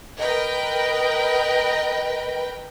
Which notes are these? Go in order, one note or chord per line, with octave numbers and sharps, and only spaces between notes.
A#4 B4 D#5 G5